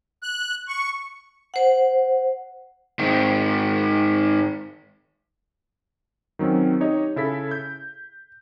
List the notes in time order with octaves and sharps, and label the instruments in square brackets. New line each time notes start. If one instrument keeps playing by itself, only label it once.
[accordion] F#6
C#6
[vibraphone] C5 F#5
[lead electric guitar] G#2 D#3
[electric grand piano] D#3 F#3 C4 C#4
D#4 G4 C#5 D#5
C#3 E4 A4 B6
G6